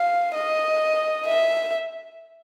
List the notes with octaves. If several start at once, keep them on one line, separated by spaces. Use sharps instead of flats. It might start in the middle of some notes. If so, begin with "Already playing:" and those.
Already playing: F5
D#5
E5